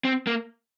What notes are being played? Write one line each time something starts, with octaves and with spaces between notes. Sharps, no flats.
C4
A#3